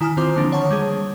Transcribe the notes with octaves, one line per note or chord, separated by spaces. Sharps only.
D#3 E4 G#5 A#5 D#6 F6
D#3 C4 F4 C5 C6 D6
D3 D#3 F3 A#3 D4
C#5 F#5 A5 C#6
G3 G#3 G#4